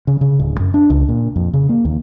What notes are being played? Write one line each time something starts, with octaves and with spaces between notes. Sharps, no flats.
C#3
C#3
D1
F#2
D4
C#2
A#2
F2
C#3
A#3
D#2